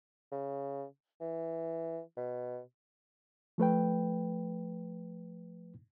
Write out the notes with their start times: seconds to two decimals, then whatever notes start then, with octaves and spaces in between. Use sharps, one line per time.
0.32 C#3
1.21 E3
2.17 B2
3.58 F3 A3 B4 G5